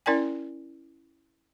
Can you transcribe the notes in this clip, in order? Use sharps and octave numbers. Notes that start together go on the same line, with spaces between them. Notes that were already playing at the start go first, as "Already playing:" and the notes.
C#4 E4 A#4 D5 G5 G#5